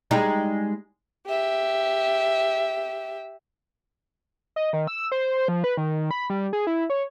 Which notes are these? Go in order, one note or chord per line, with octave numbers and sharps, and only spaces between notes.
G3 G#3 D#4
G4 E5
D#5
D#3
E6
C5
F3
B4
D#3
B5
G3
G#4
E4
C#5